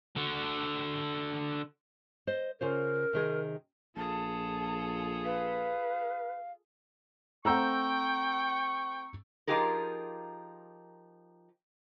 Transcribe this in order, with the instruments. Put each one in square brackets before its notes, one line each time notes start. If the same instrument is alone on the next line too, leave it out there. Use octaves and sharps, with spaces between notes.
[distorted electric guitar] D3 F#4
[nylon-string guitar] C5 D#5
[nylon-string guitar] C#3 F4 C5 [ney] A#4
[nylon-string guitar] C3 D#3 G#4
[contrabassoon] A#1 [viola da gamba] F4 G#4 A4 [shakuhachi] A5
[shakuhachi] B4 [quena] F5
[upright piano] A3 C4 F#5 [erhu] G5 [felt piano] A#5 E6 G6 [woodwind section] C#6
[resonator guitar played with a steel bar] F3 D#4 F4 G4 G#4 A#4